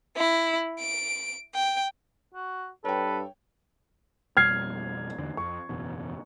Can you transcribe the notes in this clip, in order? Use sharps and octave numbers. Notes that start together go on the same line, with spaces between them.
E4
D7
G5
F#4
G2 A4 B4 C#5 G5
F2 B2 G3 F6 G#6 C7
E2 D3
F2 C#6
F#1 E2 B2